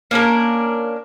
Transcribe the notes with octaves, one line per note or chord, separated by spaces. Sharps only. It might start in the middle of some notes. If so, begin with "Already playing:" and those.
A#3 C#4 D4 A#4